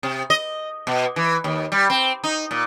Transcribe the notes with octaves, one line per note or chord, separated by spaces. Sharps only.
C3
D#5
B2
E3
D#2
G3
C4
D#4
A#2